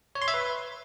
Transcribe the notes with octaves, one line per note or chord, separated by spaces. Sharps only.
C#5
C6
E5
B4